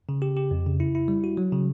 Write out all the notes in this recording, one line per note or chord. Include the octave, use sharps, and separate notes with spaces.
C#3
G4
G4
F2
C#3
E4
E4
G3
F#4
F#3
C#3